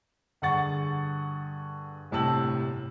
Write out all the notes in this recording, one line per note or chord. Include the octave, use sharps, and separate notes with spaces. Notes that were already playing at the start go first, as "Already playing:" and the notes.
G2 D3 G#4 F#5 C#6 A6
G1 A2 C3 A5 E6 F#7